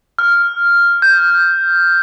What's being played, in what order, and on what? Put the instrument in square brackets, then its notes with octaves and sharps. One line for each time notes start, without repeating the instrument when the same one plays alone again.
[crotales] F6
G6